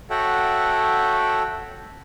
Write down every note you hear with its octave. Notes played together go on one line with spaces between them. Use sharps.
F#4 A4 C#5 E5 F#5 G5